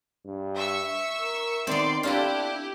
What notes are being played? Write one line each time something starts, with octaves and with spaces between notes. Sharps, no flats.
G2
E5 C#6 E6
A#4
D#3 B3 C4 D5 C6
D4 E4 F4 G4 A4 B4